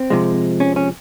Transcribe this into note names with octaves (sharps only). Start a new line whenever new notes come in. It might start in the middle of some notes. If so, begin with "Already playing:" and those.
Already playing: C4
C3 F3 G#3
C#4
C#4